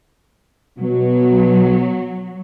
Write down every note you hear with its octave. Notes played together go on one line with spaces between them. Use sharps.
B2 F#3